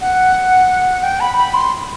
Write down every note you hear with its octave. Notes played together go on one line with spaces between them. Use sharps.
F#5
G5
B5
B5
C6